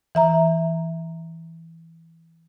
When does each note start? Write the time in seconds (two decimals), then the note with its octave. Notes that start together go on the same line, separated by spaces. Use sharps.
0.15 E3 E5 A#5